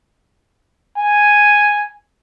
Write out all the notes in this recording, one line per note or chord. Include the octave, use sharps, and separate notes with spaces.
G#5